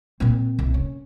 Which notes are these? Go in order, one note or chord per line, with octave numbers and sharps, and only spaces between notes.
A#2 C4
C2
C#4